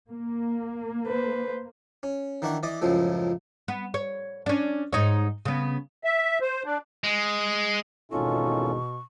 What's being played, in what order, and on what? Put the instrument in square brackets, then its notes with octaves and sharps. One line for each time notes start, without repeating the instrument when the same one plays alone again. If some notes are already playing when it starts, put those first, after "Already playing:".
[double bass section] A#3
[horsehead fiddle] B4 C5
[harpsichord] C#4
D#3 E3 D4 F#5 C#6
E3 D5 D#5 D6
C#2 F#2 A2 F3 G#3
[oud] B3
C#5
C#4 D4
G#2 D#4 C#5
C#3 B3
[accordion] E5
C5
D4
[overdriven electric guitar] G#3
[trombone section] G#1 E2 D#4 [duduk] B2 [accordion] C#4 F4 A4 [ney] C#6